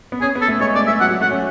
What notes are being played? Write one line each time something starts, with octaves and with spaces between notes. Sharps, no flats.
B3
C#4 G#4
B3
A4
A3
G#3 C#5
A3 D5
G#3 E5
F#3 F#5
F#3
A3 F#5
C#4